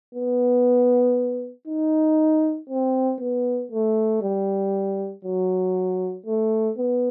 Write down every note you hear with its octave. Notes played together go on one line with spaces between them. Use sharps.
B3
D#4
C4
B3
A3
G3
F#3
A3
B3